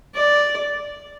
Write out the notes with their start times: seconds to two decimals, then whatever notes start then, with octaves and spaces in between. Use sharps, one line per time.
0.15 D5